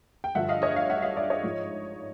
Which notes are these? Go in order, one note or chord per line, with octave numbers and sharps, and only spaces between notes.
G5
G2 D3 F3 E5 F#5
D#5 F5
C#5 D#5
D#5 F5
E5 F#5
D#5 F5
D5 E5
C#5 D#5
G#2 F3